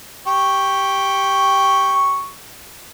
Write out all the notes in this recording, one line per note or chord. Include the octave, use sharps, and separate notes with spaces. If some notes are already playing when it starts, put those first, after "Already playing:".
G4 C#6